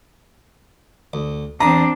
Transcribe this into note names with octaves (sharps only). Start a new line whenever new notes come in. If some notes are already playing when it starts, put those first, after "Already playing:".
D2
E2 C4 D4 A#5 D#6